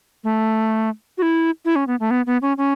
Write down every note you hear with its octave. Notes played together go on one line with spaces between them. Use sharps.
A3
F#4
E4
E4
C#4
B3
A3
B3
B3
C#4
C#4